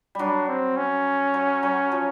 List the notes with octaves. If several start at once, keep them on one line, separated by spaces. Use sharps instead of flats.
F#3 G3 D4
C4
C#4
F#3
F#3
F3